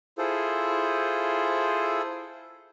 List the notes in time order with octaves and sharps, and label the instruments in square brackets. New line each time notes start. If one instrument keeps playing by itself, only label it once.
[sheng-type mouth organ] E4 F4 G#4 A4 C5